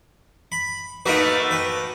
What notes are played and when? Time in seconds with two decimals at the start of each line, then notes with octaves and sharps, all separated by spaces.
0.52 B5
1.06 A3 A#3 D#4 F#4 A#4 B4
1.51 B4 G5